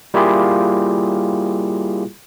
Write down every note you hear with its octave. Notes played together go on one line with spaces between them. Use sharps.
G3 A#3 E4 F4 G4 G#4